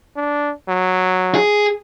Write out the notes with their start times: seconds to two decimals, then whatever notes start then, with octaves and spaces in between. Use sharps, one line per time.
0.16 D4
0.68 F#3
1.35 G#4